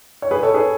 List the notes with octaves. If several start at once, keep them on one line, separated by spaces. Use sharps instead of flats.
C#5
G#4 B4
A4 C#5
G#4 B4